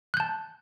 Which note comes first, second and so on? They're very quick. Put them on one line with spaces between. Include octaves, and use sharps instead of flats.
F#6 G6 A5